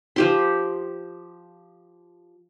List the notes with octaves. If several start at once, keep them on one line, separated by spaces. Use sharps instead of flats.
F3 G4 C6